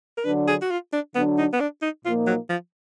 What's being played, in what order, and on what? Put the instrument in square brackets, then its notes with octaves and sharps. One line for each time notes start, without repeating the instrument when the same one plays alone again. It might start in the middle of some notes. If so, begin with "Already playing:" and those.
[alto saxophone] A#4
[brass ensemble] D3 F#3 D4 [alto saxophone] B4
[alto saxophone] G#4
F#4
F4
D4
[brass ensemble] D3 F#3 D4 [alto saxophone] B3
[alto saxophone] D#4
B3
D4
D#4
[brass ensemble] A#2 F3 A#3 D#4 [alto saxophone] F4
[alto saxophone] F#3
F3